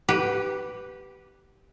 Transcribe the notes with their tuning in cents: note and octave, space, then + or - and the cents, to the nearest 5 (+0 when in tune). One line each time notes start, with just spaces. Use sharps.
G4 -10 B4 +0